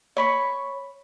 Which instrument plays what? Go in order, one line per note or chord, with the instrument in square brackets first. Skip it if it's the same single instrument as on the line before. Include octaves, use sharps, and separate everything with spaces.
[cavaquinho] C#5 B5 C#6